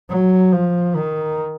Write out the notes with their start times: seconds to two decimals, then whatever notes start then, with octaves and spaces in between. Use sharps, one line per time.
0.10 F#3
0.53 F3
0.96 D#3